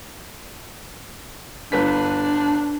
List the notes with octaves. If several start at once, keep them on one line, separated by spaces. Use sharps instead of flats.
G1 D4 B4 B6